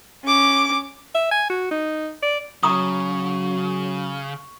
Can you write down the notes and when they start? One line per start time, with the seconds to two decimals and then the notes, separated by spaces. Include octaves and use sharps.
0.24 C#4 D6
1.15 E5
1.32 G#5
1.50 F#4
1.71 D#4
2.22 D5
2.63 C#3 F#3 A#5 C#6 D#6